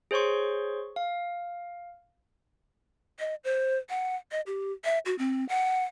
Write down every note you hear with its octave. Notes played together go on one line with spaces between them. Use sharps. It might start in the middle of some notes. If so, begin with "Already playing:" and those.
G#4 C5 C#5 C6 C#6
F5
D#5
C5
F#5
D#5
G4
E5
F#4
C4
F#5